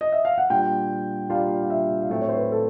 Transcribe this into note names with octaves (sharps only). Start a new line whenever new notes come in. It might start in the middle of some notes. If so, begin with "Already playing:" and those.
D#5
E5
F5
F#5
A#2 G3 A#3 D4 F4 G5
A#2 G3 A#3 D4 F4 F5
F5
E5
F5
A2 F#3 A3 C4 E5
C#5
C5
B4
A4